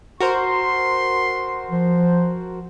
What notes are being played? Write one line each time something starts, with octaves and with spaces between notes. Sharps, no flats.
F#4 A#4 C5 C6
F3